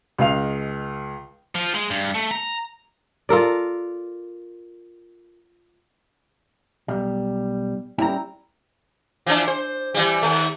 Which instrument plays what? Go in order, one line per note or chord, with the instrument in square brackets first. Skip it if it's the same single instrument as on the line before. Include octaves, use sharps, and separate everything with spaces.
[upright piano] C#2 G#3 F5 F7
[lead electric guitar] F3
G#3
G2
A3
A#5
[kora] F4 A4 A#4 D5
[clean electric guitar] B1 G3
[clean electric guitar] G3 C#4 G5 [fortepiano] E4 A#5
[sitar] E3 F3 D4
C5
E3 G3
D#2 A3